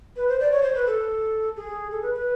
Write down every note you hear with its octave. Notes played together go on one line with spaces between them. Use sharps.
B4
C5
D5
C#5
C5
B4
A4
G#4
A4
B4
B4